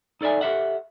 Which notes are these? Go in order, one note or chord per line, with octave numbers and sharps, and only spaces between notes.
D#4 A4 D5 E5 G#5
G4 A4 E5 F#5